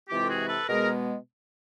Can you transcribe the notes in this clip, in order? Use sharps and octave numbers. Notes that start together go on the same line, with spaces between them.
C3 E3 G#3 C4 F4 G4
A4
F#4 G#4
A4 B4
B2 G#3 B3 G#4 A#4